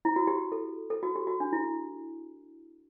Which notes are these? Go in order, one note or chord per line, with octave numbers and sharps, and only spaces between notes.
E4
F#4
G4
A4
A4
F#4
G4
F#4
D4
E4